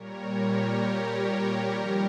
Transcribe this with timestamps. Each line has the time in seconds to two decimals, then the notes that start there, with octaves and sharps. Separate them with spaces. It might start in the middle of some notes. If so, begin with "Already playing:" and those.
Already playing: A#2 G3 A#4 C#5
0.34 G4 A#4
1.72 F2 D#3 G3